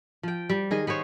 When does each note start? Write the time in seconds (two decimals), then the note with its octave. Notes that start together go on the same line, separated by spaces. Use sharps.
0.23 F3 G5
0.50 G3
0.71 D#3 G#4 D#5
0.87 B3 G#4 C5 C#5